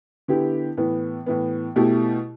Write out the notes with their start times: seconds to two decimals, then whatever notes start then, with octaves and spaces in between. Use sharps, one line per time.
0.28 D3 B3 E4 G4
0.77 A2 E3 B3
1.26 A2 E3 B3
1.76 B2 A3 E4 G4